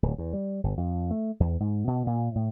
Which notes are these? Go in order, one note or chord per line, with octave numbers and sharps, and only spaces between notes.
D1
E2
G3
G1
F2
A3
E2
G#2
B2
A#2
A2